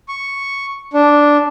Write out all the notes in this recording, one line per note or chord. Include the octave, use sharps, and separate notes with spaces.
C#6
D4